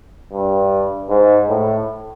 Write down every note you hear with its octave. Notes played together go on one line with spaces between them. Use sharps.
G2
G#2
A2